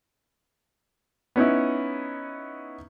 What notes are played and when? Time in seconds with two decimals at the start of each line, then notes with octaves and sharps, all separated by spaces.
1.36 B3 C#4 D#4 E4